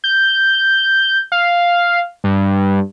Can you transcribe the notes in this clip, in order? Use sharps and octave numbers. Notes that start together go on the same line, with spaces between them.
G6
F5
G2